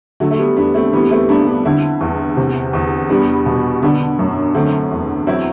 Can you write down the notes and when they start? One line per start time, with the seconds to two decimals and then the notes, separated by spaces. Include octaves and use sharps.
0.20 D3 F#3 A3
0.31 A3
0.39 G3 B3
0.56 E2 B3 D4
0.74 A3 C4
0.93 E3 G3 B3
1.10 A3 C4
1.29 G2 B3 D4
1.47 B3 D4
1.65 D3 C4 E4
2.01 E2
2.37 C3
2.73 E2
3.10 G3 B3 D4
3.46 B2
3.82 D3 B3 D4
4.19 F#2
4.55 D3 A3 C4
4.91 E2
5.27 F#3 C4 E4